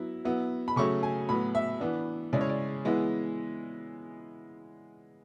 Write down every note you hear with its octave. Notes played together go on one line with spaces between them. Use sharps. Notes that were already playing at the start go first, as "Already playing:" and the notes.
Already playing: F#3 B3 E4
F#3 B3 E4
B5
C#3 F#3 A3 C#4 C#6
G#5
A2 F#3 B3 B5
E5
E3 B3 D4
C#3 G#3 C#4 E4 D5
C#5
D5
E3 G#3 B3 E4